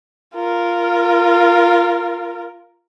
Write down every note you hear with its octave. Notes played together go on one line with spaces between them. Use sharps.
F4 A#4